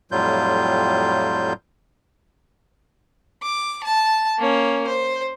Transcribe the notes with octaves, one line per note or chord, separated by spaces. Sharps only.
F2 A2 F#3 G3 F4 G6
D6
A5
A#3 C#4
C5